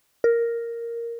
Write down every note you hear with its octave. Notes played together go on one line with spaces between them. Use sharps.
A#4